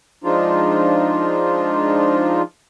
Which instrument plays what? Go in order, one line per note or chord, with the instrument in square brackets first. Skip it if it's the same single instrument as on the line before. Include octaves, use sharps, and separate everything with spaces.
[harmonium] F3 G#3 D4 D#4 F4